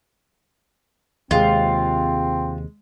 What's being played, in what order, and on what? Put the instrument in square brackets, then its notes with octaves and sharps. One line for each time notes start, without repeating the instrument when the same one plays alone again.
[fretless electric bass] D#2 C3 [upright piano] G#3 [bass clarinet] C4 [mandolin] F4